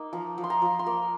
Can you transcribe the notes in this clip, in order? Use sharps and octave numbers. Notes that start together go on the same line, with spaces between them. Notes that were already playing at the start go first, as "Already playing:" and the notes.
Already playing: A#3 D#4
F3 A#5
F3
C6
A#5
F3
C6
A#3 A#5